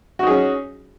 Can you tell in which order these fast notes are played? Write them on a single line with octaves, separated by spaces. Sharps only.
F#4 D#4 G#4 C#4